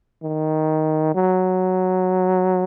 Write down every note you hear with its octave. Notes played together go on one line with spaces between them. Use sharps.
D#3
F#3